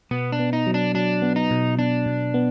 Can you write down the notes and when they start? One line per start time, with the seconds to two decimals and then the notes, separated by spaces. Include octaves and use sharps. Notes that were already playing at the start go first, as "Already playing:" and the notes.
0.11 B2 B3
0.32 D4
0.39 B3
0.53 D#4
0.67 F#3
0.74 D4
0.94 F#3 D4
1.22 B3
1.36 D#4
1.51 B2
1.79 B2 D4
2.06 B2
2.34 B3